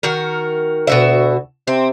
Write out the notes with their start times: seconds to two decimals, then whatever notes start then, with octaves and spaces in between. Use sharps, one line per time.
0.03 D#3 F#4 A#4
0.87 D2 B2 F#4 E5
1.67 C3 C4